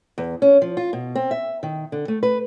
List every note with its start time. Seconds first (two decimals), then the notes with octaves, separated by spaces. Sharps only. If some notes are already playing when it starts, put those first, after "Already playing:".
0.18 E2
0.42 C#4
0.62 F3
0.77 F4
0.93 B2
1.15 C4
1.31 E5
1.63 D#3
1.92 D3
2.08 A3
2.23 B4